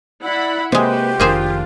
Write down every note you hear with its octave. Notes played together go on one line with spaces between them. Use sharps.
E4 D5 F#5 B5
C3 G#3 A#3 F#4 G4 B4 C5
F1 D#3 A#3 D4 F4 G#4 C5